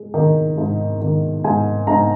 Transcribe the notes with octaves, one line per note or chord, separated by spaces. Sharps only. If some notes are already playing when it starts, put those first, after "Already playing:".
Already playing: G#3
D#3
G#2
D#3
G#2 G#5
G#2 A#5